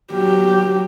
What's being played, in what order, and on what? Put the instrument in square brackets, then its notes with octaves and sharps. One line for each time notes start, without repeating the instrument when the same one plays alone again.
[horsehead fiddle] F#3 G4